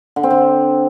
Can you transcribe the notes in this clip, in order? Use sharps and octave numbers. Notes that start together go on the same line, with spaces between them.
D3
C4
D3